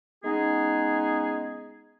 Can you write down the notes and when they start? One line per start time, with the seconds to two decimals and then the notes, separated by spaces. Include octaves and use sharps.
0.24 G#3 B3 C#4 D#4 G#4